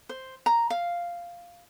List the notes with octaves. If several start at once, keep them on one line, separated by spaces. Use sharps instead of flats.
C5
A#5
F5